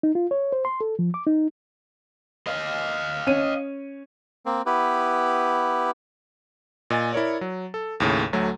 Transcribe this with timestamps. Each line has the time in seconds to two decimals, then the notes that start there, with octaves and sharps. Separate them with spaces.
0.03 D#4
0.15 F4
0.31 C#5
0.52 C5
0.65 C6
0.81 A4
0.99 F3
1.14 D6
1.27 D#4
2.47 D#5 F5
3.27 C#4 C#5 D#7
4.46 A#3 C4
4.66 B3 E4 G4 B4
6.90 A#2 D#5 G#5 A6
7.13 E4 A#4 C#5 D5
7.41 F#3
7.74 A4
8.00 D#2 A2 C#3
8.33 D2 F#3 A3